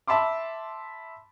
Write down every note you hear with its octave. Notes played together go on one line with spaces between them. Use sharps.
E5 A5 B5 C6 D6